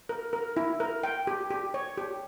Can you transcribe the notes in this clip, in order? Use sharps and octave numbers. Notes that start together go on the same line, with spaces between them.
A#4
A#4
E4
A#4
G5
G4
G4
C#5
G4